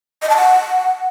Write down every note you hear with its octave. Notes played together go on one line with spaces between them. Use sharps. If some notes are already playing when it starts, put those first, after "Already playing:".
D#5
A5
F#5